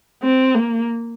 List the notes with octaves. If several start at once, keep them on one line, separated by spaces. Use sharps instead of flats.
C4
A#3